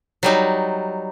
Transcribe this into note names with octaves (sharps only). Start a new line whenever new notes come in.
F#3 G3 D#4